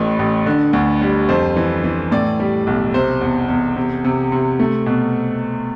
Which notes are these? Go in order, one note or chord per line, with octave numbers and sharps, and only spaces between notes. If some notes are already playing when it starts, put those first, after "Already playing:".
Already playing: A1 A2 B4
A1
D3
D2
G3
F2 C5
E3
E3
A2 D5
G3
B1
C3 C5
E2
E2
C3
C3
C3
A3
B2